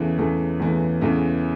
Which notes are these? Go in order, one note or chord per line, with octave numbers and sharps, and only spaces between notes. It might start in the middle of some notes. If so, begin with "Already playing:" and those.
Already playing: E2 C#3 E3 A3
E2 C#3 E3 A3
E2 C#3 E3 A3
E2 C#3 E3 A3